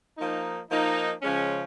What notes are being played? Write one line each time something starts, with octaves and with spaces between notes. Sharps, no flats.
F3 A#3 D#4
F3 A#3 D#4
C#3 F3 G#3 C#4